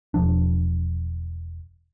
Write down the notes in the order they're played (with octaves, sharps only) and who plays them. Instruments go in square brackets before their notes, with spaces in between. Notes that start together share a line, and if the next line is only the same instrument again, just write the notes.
[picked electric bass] E1 F3 D4